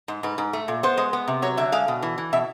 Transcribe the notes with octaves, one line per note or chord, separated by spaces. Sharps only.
G#2
G#2 B4
G#2
A3
A#2
B3 C5
G#3
B3
C3
F#3 C#5
D3 E5
G#3 F5
B2
E3
E3
B2 E5